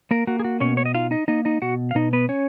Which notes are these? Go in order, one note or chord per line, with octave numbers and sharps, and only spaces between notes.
A#3 A#4
A#3 F#4
G#4
F#4
B2 C#4 C#5
C#5
D#5
D#4 F4 F5
D#4 D#5
A#3 D#4 D#5
D#4 D#5
B2 F#4 F#5
F5
B2 D#4 D#5
B3 B4
C#4 C#5